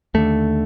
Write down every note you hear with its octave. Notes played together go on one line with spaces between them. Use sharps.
D#2 D3 A3